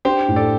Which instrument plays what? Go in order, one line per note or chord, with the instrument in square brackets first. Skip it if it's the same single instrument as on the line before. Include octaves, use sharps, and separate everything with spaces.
[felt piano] D4 [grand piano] G4 C5
[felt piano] A2
[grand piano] A4 D5